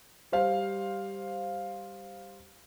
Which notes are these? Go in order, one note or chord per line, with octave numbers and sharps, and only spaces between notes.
G3 C5 F5